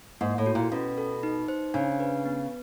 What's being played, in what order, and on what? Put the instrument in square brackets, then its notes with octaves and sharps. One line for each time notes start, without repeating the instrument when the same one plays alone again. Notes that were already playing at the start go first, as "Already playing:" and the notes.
[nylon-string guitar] G#2 [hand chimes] A#3
[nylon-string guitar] A2
[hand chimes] F#4
[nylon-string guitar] A#2
[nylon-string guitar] B2 [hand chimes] C#4
[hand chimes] A4
D#4
C5
[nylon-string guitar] C#3 [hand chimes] D4
[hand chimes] B4
B3